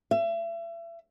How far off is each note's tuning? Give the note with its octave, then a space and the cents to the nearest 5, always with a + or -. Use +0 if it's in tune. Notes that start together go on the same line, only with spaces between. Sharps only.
E5 +35